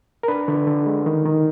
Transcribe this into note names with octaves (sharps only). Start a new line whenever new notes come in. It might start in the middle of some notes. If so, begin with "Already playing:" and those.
A#4
D4 B4
D3
D3
G#3
D#3
D#3